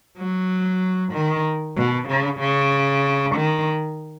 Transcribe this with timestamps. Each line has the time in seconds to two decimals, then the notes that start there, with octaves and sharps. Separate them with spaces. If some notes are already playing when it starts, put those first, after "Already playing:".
0.18 F#3
1.13 D#3
1.76 B2
2.08 C#3
2.40 C#3
3.35 D#3